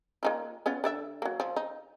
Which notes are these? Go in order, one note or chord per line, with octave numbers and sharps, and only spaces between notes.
A#3 D#4 F4
B3 C#4 F4
D3 D5 E5
F#3 A#3
F3
D#4